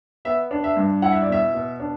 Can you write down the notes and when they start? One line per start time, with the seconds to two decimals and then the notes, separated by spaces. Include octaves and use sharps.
0.25 B3 E5
0.51 D4
0.64 E5
0.76 G2
1.02 E4 F#5
1.12 E5
1.22 D5
1.29 B2 E5
1.54 B2
1.80 D4